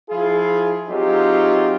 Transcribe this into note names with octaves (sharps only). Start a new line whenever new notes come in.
F3 E4 F4 G#4
F#3 C4 D#4 F4 G4 G#4